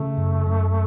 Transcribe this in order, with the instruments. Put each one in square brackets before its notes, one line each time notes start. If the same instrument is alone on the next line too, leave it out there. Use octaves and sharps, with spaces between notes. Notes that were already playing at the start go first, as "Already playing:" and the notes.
Already playing: [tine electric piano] C#3 [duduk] A3
[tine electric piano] F#2
F#2